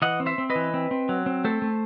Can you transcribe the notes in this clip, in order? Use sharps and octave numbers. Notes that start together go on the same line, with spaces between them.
E3 D#5 F#5
C4
C5 E5
C4
B4 D#5
E3
C4
C4
F#3
C4
A3 A4 C5
A3